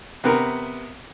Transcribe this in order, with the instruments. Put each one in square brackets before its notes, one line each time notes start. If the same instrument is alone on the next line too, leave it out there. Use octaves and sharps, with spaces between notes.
[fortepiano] C3 B3 A#4